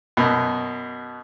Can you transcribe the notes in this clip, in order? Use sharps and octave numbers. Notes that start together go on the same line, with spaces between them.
F#2 B2